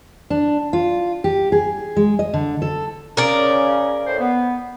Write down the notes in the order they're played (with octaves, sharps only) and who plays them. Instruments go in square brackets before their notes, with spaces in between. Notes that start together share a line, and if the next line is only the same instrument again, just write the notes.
[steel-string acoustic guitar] D4
F4
G4
G#4
G#3
D#5
D3
A4
[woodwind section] C#3 C#4 [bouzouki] A#4 D5
[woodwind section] A2 C5
B3